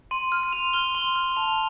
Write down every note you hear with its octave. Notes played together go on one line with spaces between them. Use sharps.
C6 D#7
F6
D#7
C6 F7
F6 G7
C6 G7
F6
A5 F7